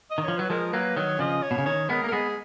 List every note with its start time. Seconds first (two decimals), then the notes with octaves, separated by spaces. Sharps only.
0.11 D#5
0.18 D#3
0.25 F3 C#5
0.38 F#3 B4
0.50 F3 G#3 A#4
0.73 F#3 A#3 B4
0.96 D#3 F#3 C#5
1.19 C#3 F3 D#5
1.43 C#5
1.51 B2
1.58 C#3
1.66 D#3 C#5
1.89 G#3 B3 A#4
2.04 A#3
2.08 A#4
2.12 G#3 B3 G#4